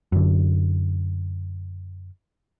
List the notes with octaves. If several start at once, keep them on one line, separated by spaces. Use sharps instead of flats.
F#2 D3